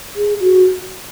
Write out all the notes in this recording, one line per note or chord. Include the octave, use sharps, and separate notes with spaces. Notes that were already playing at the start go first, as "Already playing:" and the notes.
G#4
F#4